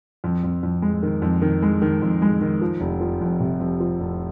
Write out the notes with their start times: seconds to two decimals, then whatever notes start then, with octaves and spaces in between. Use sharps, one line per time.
0.24 F2
0.44 F2
0.63 F2
0.82 G#3
1.03 D#3
1.22 F2
1.42 D#3
1.62 G#3
1.82 D#3
2.02 F2
2.22 G#3
2.41 D#3
2.62 F3
2.81 F1
3.01 F3
3.21 F2
3.40 C3
3.60 F2
3.80 F3
4.00 F1